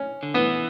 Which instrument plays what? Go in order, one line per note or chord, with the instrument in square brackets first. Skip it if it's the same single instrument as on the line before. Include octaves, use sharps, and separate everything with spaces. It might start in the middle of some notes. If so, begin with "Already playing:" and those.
Already playing: [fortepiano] C#4
[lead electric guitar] D3
[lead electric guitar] E3 [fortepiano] B3